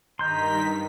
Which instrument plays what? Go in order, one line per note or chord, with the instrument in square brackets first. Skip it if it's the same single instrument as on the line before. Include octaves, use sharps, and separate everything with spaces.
[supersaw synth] G2 D#3 B6 [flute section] D#5 A#5 [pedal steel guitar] C6 G6